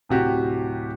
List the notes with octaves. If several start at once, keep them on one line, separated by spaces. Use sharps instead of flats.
D1 C3 F#4 G4